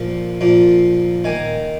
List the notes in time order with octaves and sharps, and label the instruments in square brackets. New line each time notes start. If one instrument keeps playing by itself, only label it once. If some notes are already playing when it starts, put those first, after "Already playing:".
Already playing: [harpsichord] A#2 F3 A#3
A#2 F3 A#3
D#3 A#3 G#5